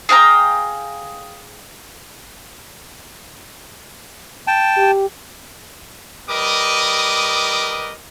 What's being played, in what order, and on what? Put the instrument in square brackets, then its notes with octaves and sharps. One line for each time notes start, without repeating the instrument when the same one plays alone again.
[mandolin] G#4 F5 G5 A#5
[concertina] G5 A5
[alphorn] G4
[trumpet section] G3 A#4 B4 D#5 D6 D#6